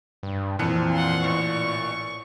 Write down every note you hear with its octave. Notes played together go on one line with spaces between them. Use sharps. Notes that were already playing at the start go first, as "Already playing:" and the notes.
G2
F2 A#2 E3 F#6 C#7
F#5 C6
A1 C#6